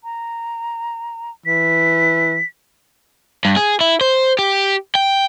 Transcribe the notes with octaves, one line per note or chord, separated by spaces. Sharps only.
A#5
E3 B6
G2
G#4
E4
C5
G4
G5